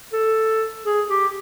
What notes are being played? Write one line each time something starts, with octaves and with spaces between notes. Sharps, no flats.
A4
G#4
G4